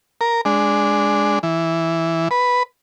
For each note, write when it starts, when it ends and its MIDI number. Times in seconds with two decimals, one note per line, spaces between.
0.21 0.41 70
0.45 1.39 56
0.45 1.39 62
1.43 2.28 52
2.31 2.63 71